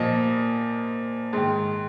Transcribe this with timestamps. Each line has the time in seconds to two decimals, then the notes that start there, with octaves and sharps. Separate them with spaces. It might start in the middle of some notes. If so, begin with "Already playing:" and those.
Already playing: A#2 F3 D#5
1.33 G#2 D#3